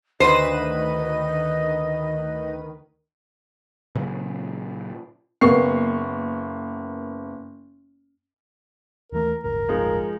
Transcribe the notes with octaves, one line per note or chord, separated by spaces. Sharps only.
D2 D#3 B4 C5 D#5 D#7
A#2 C#3 F#3
F#1 A#3 B3 C#6 C7
D#2 E3 A3 A#4
D1 G1 A#4
F3 G#3 D#4